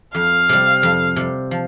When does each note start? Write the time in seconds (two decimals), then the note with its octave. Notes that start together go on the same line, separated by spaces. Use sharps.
0.15 F2 F5
0.49 C3 G3
0.83 F2
1.16 C3 G3
1.51 F3